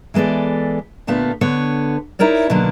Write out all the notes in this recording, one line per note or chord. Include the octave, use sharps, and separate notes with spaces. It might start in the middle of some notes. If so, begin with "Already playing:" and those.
E3 G#3 B3 A4 D5
A#2 D3 A3 B3 F4
D3 B3 C#5
D#4 E4 A#4 C#5 D5
B2 D3 D#3 F#3 A#3 D4